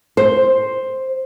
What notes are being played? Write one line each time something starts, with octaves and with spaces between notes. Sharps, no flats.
C5